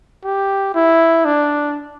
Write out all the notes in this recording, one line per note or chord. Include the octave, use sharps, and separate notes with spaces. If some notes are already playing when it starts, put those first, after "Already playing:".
G4
E4
D4